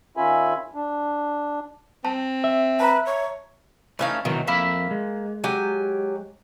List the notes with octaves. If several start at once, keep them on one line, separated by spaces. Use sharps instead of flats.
D#3 C#4 F4 E5 G#5 B5
D4
C4 A5
E5
B4 A5 A#5
C#5
E3 A3 C#4 D#4 E5 F5
B2 D#3 E3 F#3
F2 A#3 E5 B5
G#3
F#3 G4 G#5